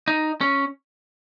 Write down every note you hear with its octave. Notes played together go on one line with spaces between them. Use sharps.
D#4
C#4